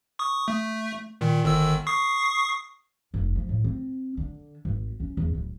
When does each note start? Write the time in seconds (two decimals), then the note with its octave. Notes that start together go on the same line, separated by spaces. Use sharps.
0.19 C#6 D#6
0.48 A3
1.21 A#2 D#3
1.44 G1 D#3 E6
1.87 C#6 D#6 C7
3.14 F1
3.36 F3
3.49 A2
3.64 C4
4.17 D3
4.65 G#1
5.00 C#4
5.17 E2
5.35 D1